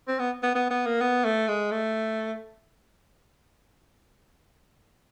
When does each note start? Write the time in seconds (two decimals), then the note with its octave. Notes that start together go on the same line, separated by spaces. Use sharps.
0.08 C4
0.19 B3
0.43 B3
0.55 B3
0.70 B3
0.86 A#3
1.01 B3
1.25 A3
1.48 G#3
1.71 A3